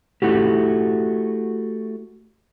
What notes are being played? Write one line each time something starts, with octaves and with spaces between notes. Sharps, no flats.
A3 E4 F#4 G4